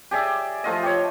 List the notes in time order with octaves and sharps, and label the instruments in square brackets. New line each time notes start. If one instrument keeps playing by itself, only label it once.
[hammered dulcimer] G4 G#4 D5 E5
F3 A3 F4 D#5
G4 C#5